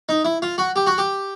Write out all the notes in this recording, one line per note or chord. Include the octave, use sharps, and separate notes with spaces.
D#4
E4
F4
F#4
G4
F#4
G4